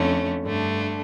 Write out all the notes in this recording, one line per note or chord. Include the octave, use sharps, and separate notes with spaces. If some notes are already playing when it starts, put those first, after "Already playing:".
Already playing: F2 D3 A3 C#4
G2 D3 A3 D4